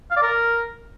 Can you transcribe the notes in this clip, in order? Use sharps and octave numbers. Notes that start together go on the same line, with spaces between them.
F5
D5
A#4